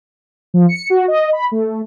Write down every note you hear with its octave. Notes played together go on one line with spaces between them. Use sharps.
F3
C#7
F#4
D#5
B5
A3